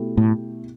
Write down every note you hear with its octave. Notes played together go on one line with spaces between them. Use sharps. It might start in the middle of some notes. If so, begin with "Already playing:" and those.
Already playing: B2 A3 E4 G4
A2